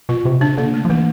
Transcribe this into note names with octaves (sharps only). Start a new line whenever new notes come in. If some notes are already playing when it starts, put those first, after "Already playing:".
B2 F4
C3
C#3 D4
D3 A#3
A3
F3
E3 A#3